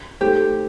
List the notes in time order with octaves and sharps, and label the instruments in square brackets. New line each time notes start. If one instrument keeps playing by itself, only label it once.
[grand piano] A3 D#4 A4 C5 [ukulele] G4